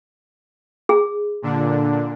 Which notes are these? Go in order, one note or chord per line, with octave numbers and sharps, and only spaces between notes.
G#4
A#2 D3 D4